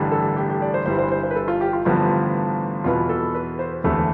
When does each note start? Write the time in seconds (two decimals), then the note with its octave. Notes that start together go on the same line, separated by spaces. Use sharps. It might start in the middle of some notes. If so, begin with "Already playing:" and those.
Already playing: A1 G2 D3 G3
0.12 A4
0.37 G4
0.50 G4
0.62 D5
0.74 C5
0.86 G1 G2 E3 G3 C5
0.99 C5
1.12 C5
1.23 C5
1.31 B4
1.35 A4
1.48 F4
1.61 G4
1.73 F4
1.85 A1 G2 D3 F3 B3 F4
2.84 E2 B2 B3 F4
3.09 A4
3.34 B4
3.59 C5
3.84 E1 E2 D3 A3